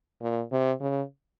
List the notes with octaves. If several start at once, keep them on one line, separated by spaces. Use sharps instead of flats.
A#2
C3
C#3